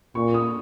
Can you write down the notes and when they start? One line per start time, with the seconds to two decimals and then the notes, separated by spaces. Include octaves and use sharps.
0.15 A#2 C#6
0.34 D#6